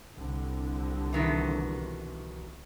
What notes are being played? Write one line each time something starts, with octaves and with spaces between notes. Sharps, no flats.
C2 D3
B2 D#3 E3